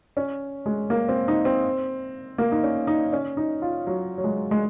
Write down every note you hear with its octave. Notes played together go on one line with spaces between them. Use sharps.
C#4
G#3
A#3
C4
D#4
C4
A#3
D#4
C#4
D#4
C#4
D#4
F4
F#3
F#3
G#3
G#3